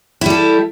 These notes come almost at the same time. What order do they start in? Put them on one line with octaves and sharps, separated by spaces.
E4 G3 A4